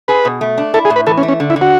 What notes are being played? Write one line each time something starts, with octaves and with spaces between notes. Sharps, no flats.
G#4 B4
B2
A3
D4
E4 A4
G#4
A2
B4
E3 A4
C#4
A3
C#4
D3
E4
D3
F#4